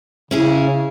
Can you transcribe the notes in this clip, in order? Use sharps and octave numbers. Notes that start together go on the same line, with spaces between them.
C#3 C#4 E4 G#4